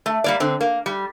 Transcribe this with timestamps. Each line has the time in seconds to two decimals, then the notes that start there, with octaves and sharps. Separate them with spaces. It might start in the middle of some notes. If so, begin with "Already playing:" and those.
0.06 A3
0.24 G3 A#3 D5
0.40 D3 C4
0.61 A#3
0.86 G3